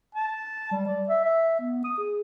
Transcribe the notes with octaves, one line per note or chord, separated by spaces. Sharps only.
A5
G3
D5
E5
E5
B3
D#6
G#4